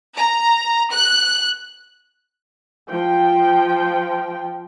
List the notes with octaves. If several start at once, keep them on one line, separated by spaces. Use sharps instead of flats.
A#5
F#6
F3 G5